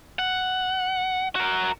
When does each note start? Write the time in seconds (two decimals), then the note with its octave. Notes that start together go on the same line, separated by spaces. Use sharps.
0.19 F#5
1.35 F#4 A#4